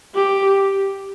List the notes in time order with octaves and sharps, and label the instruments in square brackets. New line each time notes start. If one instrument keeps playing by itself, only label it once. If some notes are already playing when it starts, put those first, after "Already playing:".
[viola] G4